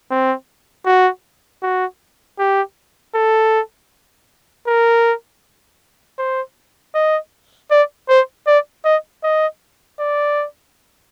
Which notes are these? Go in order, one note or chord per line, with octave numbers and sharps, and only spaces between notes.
C4
F#4
F#4
G4
A4
A#4
C5
D#5
D5
C5
D5
D#5
D#5
D5